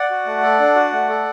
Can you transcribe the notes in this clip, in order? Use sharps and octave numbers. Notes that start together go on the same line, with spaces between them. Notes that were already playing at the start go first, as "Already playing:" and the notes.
Already playing: D5 F#5
F#4
A3
A4
D4
F#4
A3
A4